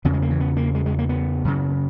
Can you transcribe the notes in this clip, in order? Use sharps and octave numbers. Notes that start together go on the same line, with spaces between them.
E2 C#3 B3
G#3
A#3
E3
B3
A#3
G#3
G#3
A#3
B3
F#2 C#3